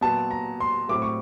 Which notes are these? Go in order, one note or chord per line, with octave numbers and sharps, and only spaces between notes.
A#2 F#3 B3 A5
A#5
C6
A2 F#3 A3 C4 D6
C#6